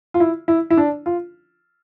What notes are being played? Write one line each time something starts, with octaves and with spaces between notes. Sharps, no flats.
F4
E4
E4
E4
D4
F4